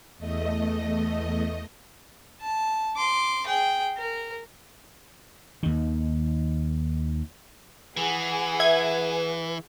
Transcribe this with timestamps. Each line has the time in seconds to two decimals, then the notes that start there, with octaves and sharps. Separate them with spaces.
0.18 E2 A3 D#5
2.41 A5
2.96 C6 D6
3.46 G#4 G5
3.97 A#4
5.63 D#2 D#3
7.97 E3 G#4 F#5 G#5
8.60 B4 E5 G#6